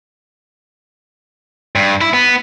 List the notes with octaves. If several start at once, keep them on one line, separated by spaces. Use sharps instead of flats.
G2
E4
B3